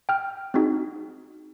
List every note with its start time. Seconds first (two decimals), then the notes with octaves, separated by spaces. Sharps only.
0.09 G5 F6
0.54 C4 D4 D#4 F#4 G#4